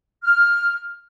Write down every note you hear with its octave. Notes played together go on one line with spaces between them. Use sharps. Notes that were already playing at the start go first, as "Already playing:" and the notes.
F6